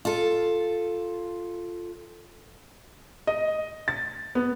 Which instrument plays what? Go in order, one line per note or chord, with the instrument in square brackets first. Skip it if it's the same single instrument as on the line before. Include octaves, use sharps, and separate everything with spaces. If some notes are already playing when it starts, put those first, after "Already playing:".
[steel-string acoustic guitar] F4 A4
[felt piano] D#5
A6
B3